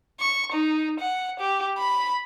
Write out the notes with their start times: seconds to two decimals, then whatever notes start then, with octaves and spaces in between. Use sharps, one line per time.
0.20 C#6
0.52 D#4
1.00 F#5
1.40 G4
1.78 B5